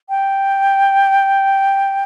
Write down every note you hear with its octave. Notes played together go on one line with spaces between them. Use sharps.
G5